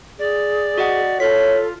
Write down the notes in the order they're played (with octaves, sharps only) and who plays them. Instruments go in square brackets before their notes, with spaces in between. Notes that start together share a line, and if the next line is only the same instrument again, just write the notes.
[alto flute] G#4 [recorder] D5
[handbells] F#4 D#5 F#5
[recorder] F4 [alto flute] A4 [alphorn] C#5 [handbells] B6